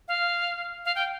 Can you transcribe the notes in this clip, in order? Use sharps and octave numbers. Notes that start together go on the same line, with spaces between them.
F5
F5
G5